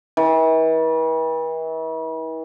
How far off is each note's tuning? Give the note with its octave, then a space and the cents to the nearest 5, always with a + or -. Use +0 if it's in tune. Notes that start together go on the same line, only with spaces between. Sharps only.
E3 -40